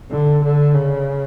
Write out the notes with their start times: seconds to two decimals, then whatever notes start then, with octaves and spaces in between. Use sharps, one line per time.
0.11 D3
0.44 D3
0.75 C#3